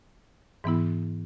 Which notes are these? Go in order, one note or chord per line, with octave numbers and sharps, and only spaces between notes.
G#2 E3 B3 E4